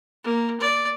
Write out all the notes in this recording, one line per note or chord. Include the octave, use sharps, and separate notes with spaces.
A#3
D5